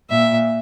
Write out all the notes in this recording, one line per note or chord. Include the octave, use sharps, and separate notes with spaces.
A#2 E5